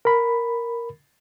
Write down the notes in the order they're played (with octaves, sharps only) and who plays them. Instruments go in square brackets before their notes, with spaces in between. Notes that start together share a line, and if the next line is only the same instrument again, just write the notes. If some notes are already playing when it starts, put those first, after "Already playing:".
[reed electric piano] A#4 B5